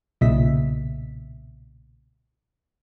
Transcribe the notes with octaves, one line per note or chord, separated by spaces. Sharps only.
B1 A#2 C#3 D#5 E5 B6